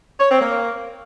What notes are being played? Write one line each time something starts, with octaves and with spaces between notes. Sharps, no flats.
C#5
C4
A#3